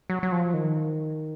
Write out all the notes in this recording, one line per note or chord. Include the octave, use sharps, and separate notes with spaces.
F#3
F#3
F3
D#3